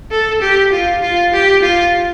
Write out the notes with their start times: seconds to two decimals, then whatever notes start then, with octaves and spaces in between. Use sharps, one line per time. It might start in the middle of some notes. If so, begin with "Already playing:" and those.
0.11 A4
0.42 G4
0.72 F4
1.03 F4
1.33 G4
1.63 F4